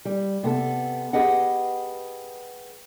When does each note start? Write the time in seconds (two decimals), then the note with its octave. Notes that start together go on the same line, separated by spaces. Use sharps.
0.05 G3
0.43 C3 B3 A4
1.13 G4 G#4 B4 D#5 F#5